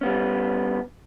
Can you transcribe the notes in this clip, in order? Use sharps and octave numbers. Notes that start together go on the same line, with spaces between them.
G3 B3 C#4